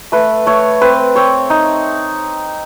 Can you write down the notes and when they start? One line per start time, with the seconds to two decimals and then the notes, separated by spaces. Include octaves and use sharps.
0.12 A3 B4
0.46 A3 C#5
0.81 C4 B4
1.16 C4 C#5
1.50 D#4